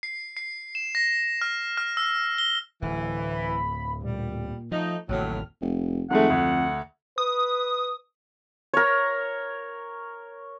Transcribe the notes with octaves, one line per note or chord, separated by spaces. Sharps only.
C7
C7
E7
A#6
F6
F6
E6
G7
D1 E3
B5
A#2 G3
F3 A3 D#4
A1 D#2 A2 C3 F#3 F6
F1
F2 D#3 G#3 A3 F#5
D2
B4 D#6
A#4 C#5